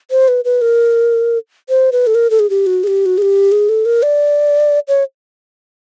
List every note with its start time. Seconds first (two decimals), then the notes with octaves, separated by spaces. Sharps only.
0.11 C5
0.28 B4
0.45 B4
0.61 A#4
1.69 C5
1.92 B4
2.07 A4
2.15 A#4
2.30 A4
2.40 G#4
2.50 G4
2.66 F#4
2.84 G#4
2.87 G4
3.06 F#4
3.18 G#4
3.22 G4
3.52 G#4
3.69 A4
3.85 A#4
4.03 D5
4.88 C#5